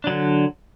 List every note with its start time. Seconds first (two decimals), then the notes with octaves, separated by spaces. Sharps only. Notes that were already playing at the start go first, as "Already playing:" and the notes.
0.04 D4
0.07 F#3
0.10 D3